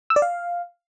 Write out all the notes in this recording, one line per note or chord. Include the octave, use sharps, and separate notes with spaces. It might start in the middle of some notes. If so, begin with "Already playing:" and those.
E6
D5
F5